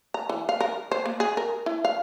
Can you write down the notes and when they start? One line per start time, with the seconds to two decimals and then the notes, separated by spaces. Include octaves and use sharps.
0.14 A#5
0.29 E3
0.49 F5
0.61 A#4
0.92 C5
1.06 A#3
1.20 G#4
1.37 A#4
1.66 E4
1.85 F5